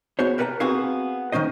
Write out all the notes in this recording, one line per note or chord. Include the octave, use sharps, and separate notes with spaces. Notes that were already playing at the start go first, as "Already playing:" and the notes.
B3 F#4 G#4 C5 C#5
A#4 B4 C#5 F#5 A5 A#5
B3 C4 F#4 G#4 B4 F5
D#3 A3 C#4 C5 D#5